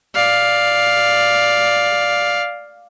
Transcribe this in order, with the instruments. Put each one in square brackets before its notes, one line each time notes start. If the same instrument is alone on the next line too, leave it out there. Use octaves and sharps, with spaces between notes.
[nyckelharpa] D5 F5